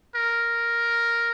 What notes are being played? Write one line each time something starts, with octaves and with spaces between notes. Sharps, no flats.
A#4